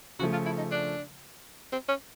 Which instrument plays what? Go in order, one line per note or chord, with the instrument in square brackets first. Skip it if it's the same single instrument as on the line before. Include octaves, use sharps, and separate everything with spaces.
[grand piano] C#3 F3 A3 [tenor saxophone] F#4
[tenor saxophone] F4
E4
D#4
D4
C4
C#4